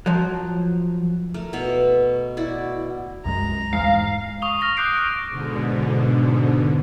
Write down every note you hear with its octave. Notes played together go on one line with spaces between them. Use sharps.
F3 F#3
A3 A#4
B2 B3 E5 F5
E4 F#4 D5
C2 F#2 G#3 A#5
E2 G#2 G#3 F5
C#6 D#6 F7 G7
F6 A#6 F7
D6 F#6 G6 C7 D7
D7 D#7
G#2 B2 D3